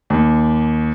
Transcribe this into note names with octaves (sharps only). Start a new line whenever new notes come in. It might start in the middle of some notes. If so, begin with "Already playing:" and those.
D#2